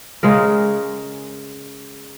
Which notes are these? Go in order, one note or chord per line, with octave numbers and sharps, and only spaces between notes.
C#3 G#3 G#4 A#4